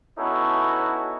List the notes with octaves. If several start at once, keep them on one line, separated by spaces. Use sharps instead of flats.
B3 C#4 D#4 E4 F#4 A4